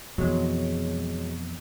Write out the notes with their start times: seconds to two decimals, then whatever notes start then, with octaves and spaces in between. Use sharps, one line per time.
0.18 F2 B2 E3 F#3 G#3